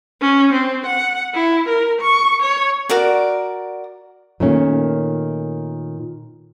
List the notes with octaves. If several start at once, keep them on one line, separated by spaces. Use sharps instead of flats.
C#4
C4
F#5
E4
A#4
C#6
C#5
F#4 A#4 D5
A#2 D#3 A3 A#3 C#4